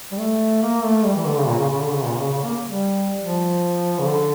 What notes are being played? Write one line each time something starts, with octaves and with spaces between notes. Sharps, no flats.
G3
A3
A#3
A3
G3
E3
D3
C#3
A#2
C#3
C#3
D3
C#3
A#2
C#3
C#3
A#3
G3
F3
C#3
D3